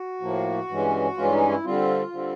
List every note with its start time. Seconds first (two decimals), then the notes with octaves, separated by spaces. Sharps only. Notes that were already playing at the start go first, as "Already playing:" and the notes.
Already playing: F#4
0.21 A2 F3 A#3
0.69 G2 E3 G#3 C#4
1.17 G2 E3 G#3 C#4 F4
1.33 D#4
1.48 E4
1.64 D3 G3 C4 F4
2.12 D3 G3 C4